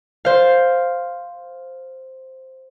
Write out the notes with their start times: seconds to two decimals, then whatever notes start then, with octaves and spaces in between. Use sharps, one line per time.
0.25 C5 F5